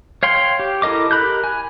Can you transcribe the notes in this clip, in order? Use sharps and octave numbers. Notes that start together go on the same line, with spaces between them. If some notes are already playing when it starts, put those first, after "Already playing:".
C#5 F5 G5 C6
G4
E4 A4 A#4 D#5 D6
G4 A#4 B5 F#6 G6
G#5